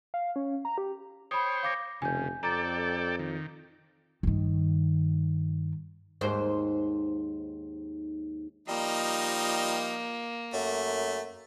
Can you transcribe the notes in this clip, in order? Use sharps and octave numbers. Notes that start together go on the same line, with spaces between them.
F5
C#4
A#5
G4
C5 C#5 G5 B5 D#6
F5 D6 A#6
F1 C#3 G#5 G6
F2 A4 D5 G5 A#5 D6 A6
D#3
G2 D#3
D#2 G#2 C5
F3 G3 A#3 D#4 D#5
F#2 A3